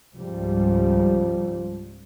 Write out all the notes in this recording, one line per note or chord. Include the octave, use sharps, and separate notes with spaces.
C#2 G#2 F3 G3